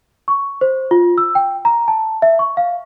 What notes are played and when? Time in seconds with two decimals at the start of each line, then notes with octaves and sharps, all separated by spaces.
0.28 C#6
0.61 C5
0.91 F4
1.18 E6
1.35 G5
1.65 A#5
1.88 A5
2.22 E5
2.39 C#6
2.57 F5